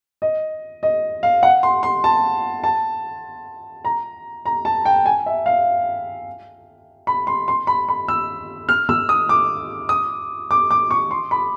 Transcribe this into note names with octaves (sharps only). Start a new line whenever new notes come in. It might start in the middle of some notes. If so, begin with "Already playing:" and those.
D#5
D#5
F5
F#5
C6
C6
A5
A5
A#5
A#5
A5
G5
G#5
E5
F5
B5
C6
C6
B5
B5
E6
F6
E6
D#6
D6
D#6
D6
D6
C#6
C6
B5